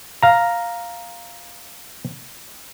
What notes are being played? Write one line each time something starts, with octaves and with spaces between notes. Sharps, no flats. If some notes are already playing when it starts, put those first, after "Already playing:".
F5 A#5